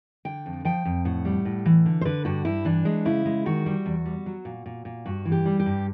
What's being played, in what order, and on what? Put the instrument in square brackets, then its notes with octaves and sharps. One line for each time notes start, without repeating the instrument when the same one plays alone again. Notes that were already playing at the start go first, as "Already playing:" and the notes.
[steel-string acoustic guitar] D3 G5
F2
F3 G5
F2
A2 F#5
G3
A2
E3
D3
C5
D3 B4
G2 F#4
G2 E4
E3 D4
G#3
C#3 E4
G#3
D#3 F#4
G3
E2
G3
F#3
A#2
A#2
A#2
G2 F#4
E3
G4
G3
G4
G2